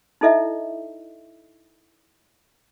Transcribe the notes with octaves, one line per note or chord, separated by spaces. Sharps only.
D#4 E4 A4 D#5 E5